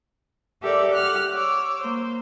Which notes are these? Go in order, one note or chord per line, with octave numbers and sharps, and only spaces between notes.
G4 A4 A#4 D5 E5
G4 F#5 F6 F#6
C#5 D6 E6
A#3 C5